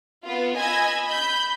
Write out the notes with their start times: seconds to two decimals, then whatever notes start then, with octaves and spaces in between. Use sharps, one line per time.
0.25 B3 F4
0.56 D#5 G#5 B5 E6 G#6
1.06 B5 G6